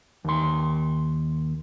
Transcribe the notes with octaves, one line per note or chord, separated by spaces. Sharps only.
D#2 C6